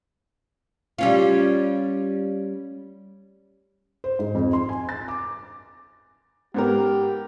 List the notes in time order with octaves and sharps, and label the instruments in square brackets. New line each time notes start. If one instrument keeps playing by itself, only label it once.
[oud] G3 C#4 F4
[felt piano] C5
G#2
F2
C6
G#5
A6
D6
[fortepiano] G#2 B3 A#4 [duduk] G4